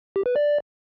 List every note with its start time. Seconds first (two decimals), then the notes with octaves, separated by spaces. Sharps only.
0.16 G4
0.26 B4
0.36 D5